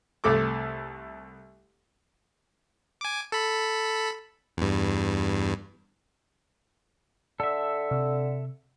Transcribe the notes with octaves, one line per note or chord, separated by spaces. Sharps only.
C2 A3 A4 D6
G#5 D6
A4 B5
E2 G2
D3 A4 E5
C3